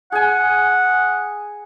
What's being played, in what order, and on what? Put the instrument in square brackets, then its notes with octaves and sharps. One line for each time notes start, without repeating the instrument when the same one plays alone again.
[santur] G#4 G#5 [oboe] F#5